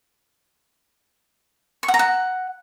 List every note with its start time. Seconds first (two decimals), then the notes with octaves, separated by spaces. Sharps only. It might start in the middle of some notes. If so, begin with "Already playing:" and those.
1.83 C#6
1.88 F#5
1.94 A#5
1.99 F#5